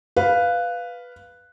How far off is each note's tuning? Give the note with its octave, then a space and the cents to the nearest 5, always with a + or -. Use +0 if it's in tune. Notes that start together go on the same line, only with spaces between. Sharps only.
B4 +0 F5 +0